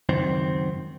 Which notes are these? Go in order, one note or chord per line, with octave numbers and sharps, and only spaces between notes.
C#2 F#2 D#3 C4